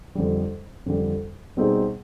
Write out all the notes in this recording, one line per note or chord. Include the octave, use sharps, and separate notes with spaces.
F2 D3 G3
F2 D3 G3
B2 G3 C4 D#4 G#4